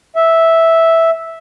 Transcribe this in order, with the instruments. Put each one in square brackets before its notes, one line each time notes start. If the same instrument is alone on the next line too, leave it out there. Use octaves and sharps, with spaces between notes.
[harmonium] E5